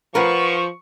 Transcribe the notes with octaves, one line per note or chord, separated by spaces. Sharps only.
F3 A#4 B4 F#5 C#6